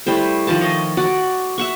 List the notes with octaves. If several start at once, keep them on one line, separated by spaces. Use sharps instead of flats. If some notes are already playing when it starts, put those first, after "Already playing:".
G3 A3 E4 C5
D#3 F3 C5 A5
C#5 D#5
F#4 D5 F#5
E5 F#5 C#6